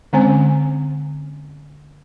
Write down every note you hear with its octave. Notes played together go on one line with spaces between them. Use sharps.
D3 G#3 C4 C#4 C5 G#5